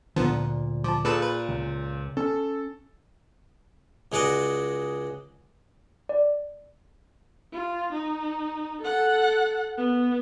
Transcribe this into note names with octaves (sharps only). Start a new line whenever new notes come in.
D2 A#2 D3 F3 B3
F3 A5 D6
A#2 G#4 A4 B4 A5
B4
C#2
C#4 A4 A5
C#2 G#3 F#4 D5 D#5
D5
F4
D#4
A4 F#5
B3